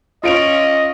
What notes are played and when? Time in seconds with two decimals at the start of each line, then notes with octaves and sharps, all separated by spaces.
0.23 C#4 F4 D#5 D7 F7